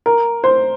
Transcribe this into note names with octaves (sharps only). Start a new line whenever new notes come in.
A#4
C5